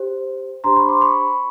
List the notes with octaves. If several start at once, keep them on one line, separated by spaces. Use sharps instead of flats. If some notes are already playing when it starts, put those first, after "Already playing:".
Already playing: G4 C5
D4 G4 C5 A#5 C6
B5 C#6
C6 D6
B5 C#6